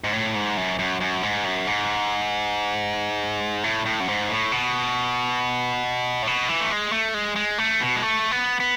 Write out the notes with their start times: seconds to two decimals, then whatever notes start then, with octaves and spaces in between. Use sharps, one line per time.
0.04 G#2
0.13 A2
0.35 G#2
0.57 F#2
0.79 F#2
1.01 F#2
1.23 G#2
1.45 F#2
1.67 G#2
3.64 A2
3.86 A2
4.00 F#2
4.08 G#2
4.29 A2
4.52 B2
6.23 A2
6.27 B2
6.49 E3
6.60 A3
6.71 G#3
6.92 A3
7.14 G#3
7.36 G#3
7.58 A3
7.80 B2
7.96 G#3
8.02 A3
8.31 B3
8.60 B3